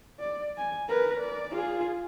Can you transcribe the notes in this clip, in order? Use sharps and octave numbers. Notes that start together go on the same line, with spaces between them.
D5
G#5
A#4 B4
D5
F4 G#4